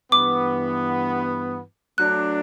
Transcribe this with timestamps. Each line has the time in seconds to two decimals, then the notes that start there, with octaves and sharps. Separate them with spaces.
0.12 G2 E3 B3 D6
1.98 F#3 A3 D4 F#6